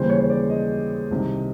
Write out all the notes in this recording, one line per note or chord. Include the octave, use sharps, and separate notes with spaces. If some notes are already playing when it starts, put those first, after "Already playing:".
Already playing: D#2 C#3 E3 G3 C5
C#5
C#5
D5
D#5
C2 C3 D#3